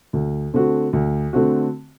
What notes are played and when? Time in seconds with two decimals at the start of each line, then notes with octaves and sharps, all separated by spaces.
0.13 D2
0.54 D3 A3 C4 F#4
0.93 D2
1.33 D3 A3 C4 F#4